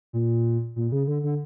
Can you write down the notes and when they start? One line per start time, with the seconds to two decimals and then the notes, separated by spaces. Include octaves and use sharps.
0.13 A#2
0.76 A#2
0.92 C#3
1.07 D3
1.23 D3